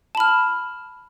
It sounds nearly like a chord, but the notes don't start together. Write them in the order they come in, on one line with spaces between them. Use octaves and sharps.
A5 B5 F6